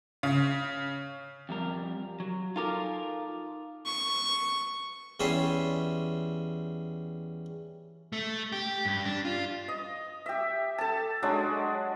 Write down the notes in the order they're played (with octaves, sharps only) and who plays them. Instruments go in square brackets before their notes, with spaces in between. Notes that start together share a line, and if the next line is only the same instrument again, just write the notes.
[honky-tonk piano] C#3
[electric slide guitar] F2 G3 A#4
F#3
[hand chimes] D#4 A4 D6 [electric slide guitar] F4 A#4
[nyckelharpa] C#6
[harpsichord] E2 G3 C#4 E5 C6
[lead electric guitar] A3
G4
G2
D4
F4
[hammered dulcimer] D#5
G4 E5
A4 A5
F#3 G#3 D4